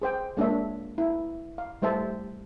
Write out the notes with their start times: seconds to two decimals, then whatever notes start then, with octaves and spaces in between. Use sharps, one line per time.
0.02 G#4 C5 G5
0.37 G#3 A#3 D4 F4 C#5 E5
0.98 E4
1.58 F5
1.82 G3 A3 C5 E5 A5